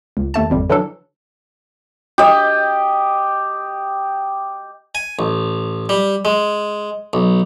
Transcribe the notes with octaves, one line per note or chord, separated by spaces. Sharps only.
C#2
D#2 A3 A5
G#1 F2 G3
D3 E3 F#3 D4 A4
G4 D#5
G#5
A1
G3
G#3
B1